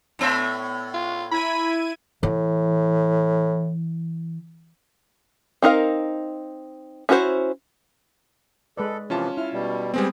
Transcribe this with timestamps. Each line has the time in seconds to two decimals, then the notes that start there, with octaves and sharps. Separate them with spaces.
0.19 A2 B3 E5
0.94 F4
1.31 E4 B5 G#6 D#7
2.23 A2 E3
5.62 C4 D#4 A#4 F5
7.09 C#4 E4 F#4 A4 C5
8.77 G#3 A4 B4 D5
9.10 C3 E3 F3 C#4 F4 A5
9.37 E4 F6
9.53 B2 G3
9.94 G3 G#3 B3 C4 G#4